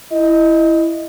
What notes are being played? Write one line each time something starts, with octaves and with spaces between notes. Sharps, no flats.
E4 D#5